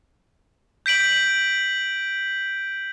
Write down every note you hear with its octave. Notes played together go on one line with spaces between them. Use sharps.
G6 B6 D7 F#7